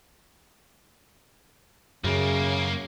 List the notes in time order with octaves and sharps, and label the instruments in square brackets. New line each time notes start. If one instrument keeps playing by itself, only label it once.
[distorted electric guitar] B1 A#3 [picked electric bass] F#2 [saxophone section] C#3